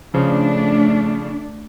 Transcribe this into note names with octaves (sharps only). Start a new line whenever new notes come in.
C#3 F3 A3 D4